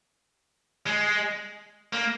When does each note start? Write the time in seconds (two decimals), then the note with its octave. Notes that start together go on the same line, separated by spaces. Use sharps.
0.87 G#3
1.93 A#3